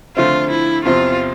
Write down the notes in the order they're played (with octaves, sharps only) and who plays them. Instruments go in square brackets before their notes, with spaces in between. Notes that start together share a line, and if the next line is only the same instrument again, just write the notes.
[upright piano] D3 F3 A3 C4 [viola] F4
[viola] E4
[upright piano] E2 C3 F3 C4 [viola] F4